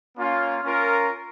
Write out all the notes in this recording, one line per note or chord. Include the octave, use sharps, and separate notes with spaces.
A#3 C#4 F4
C#4 F4 A#4